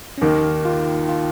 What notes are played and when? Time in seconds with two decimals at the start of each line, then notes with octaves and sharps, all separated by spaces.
0.18 C#4
0.21 D#2 D#3 A#3 D#4
0.65 F4
1.09 F4